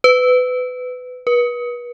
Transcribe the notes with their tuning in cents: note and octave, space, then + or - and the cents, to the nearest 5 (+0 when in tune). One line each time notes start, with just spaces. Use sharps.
B4 +25
B4 -35